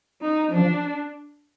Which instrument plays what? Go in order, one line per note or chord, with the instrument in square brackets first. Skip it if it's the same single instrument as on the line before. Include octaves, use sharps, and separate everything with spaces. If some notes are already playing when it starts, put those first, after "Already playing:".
[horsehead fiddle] D#4
[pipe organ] F3 [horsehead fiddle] D4